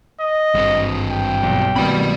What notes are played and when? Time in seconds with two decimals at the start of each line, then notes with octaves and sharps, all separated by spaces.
0.21 D#5
0.55 G#1 G2 C4
1.10 G5
1.43 B1
1.76 C2 B2 D#3 A3 C4 D5 B5